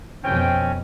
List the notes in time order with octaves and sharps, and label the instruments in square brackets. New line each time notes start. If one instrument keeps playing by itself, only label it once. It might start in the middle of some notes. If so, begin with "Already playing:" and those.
[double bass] F2 B2 [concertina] C4 C#4 [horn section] G5